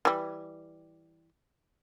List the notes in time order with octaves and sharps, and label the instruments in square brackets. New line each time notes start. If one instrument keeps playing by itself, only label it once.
[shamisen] E3 G3